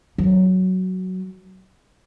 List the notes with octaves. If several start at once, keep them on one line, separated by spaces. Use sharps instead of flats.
F#3